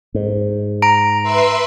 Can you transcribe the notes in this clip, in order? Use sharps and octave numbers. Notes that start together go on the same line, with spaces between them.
G#2
A#5 D7
B4 E5 C6